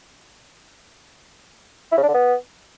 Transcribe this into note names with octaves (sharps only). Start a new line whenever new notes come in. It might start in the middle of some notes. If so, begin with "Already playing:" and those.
E4
C#3
D4
D3
B3